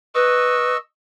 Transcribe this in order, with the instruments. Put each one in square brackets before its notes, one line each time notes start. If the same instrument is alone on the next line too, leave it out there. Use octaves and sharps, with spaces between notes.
[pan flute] B4 [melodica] D#5 C#6 E6